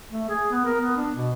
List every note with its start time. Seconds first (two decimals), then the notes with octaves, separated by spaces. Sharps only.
0.11 A3
0.29 G#4
0.50 B3
0.65 A#4
0.81 B3
0.97 D4
1.15 B2